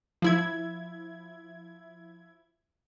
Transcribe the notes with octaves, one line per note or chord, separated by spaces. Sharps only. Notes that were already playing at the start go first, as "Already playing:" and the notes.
F3 E4 G#6